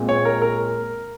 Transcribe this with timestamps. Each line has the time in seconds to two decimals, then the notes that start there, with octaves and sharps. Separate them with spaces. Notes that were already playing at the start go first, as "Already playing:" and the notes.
Already playing: A#2 G#3 C4
0.09 C#5
0.25 A#4
0.42 A#4